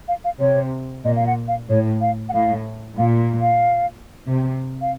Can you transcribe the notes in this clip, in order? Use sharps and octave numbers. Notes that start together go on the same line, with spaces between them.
F5
F5
C3 C#5
A#2 D#5
F5
F#5
F5
A2 C#5
F5
F#5
A2 F5
A#2 F5
F5
C3
F5